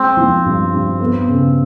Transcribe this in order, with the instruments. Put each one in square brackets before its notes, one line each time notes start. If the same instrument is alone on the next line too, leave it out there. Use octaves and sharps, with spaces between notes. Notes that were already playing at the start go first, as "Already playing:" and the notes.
Already playing: [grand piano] G#3 [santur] C4
[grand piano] F3
G2
G2
B3
C#3